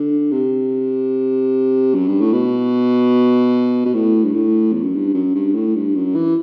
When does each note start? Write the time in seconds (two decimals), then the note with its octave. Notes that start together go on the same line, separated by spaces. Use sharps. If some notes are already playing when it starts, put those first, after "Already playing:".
Already playing: D3
0.31 C3
1.94 F#2
2.07 G2
2.21 A2
2.33 B2
3.85 B2
3.94 A2
4.24 G2
4.34 A2
4.73 E2
4.84 F#2
4.94 G2
5.14 F#2
5.35 G2
5.54 A2
5.75 G2
5.95 F#2
6.15 E3